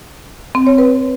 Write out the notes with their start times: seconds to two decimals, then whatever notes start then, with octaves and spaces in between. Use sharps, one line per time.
0.55 C4
0.67 C#5
0.78 B4